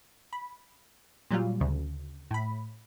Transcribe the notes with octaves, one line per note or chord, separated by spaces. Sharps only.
B5
A#2 F#3 G3 F4
D2 C#3
A2 B5